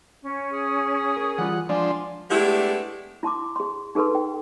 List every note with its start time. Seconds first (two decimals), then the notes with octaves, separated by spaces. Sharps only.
0.23 C#4
0.53 G#4
1.17 A#4
1.38 E3 G3 F4 F#5
1.69 F3 G#3 D4 D5 G#5 C6
2.31 G#3 A3 B3 D4 E4 G4
3.23 E4 A5 C6 D6
3.56 G#4 C6
3.95 D#4 G#4 A4 B4 C6
4.15 G5